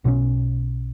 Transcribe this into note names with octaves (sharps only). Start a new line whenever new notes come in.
B1 B2 F#3 C#4